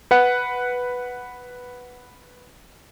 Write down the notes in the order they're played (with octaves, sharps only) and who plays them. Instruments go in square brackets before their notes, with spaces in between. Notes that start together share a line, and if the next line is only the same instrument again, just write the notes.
[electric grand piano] B4 F#5